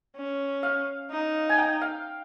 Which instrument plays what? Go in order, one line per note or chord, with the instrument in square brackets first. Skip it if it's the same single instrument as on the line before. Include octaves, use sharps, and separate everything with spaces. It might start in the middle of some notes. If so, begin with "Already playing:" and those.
[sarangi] C#4
[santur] F5
[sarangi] D#4
[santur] G#5
G5
F5